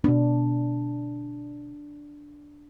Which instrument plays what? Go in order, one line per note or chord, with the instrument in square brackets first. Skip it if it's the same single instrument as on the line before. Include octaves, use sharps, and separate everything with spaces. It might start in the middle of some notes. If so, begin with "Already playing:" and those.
[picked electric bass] B2 B3 [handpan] D4